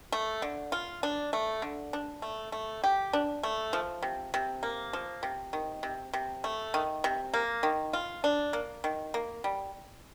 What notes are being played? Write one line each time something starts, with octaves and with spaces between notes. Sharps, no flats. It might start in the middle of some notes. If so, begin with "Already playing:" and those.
A3
D3
F4
D4
A3
D3
D4
A3
A3
G4
D4
A3
F3
C3
C3
A#3
F3
C3
D#3
C3
C3
A3
D#3
C3
A#3
D#3
F4
D4
A#3
D#3
A#3
G3